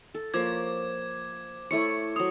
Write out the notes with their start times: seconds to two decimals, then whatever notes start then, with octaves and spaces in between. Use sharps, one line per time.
0.15 A4
0.34 F3 A#3 C#5 D6 G#6
1.71 A3 E4 C#5 C#7
2.16 F#3 C5 D#6